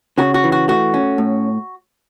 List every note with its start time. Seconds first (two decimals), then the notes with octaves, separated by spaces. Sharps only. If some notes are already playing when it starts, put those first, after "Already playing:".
0.18 C#3 F#4
0.34 F#4
0.44 E3
0.52 F#4
0.68 A3 F#4
0.94 C#4
1.18 A2